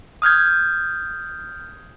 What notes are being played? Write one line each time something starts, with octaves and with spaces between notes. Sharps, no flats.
D#6 F6 G6 G#6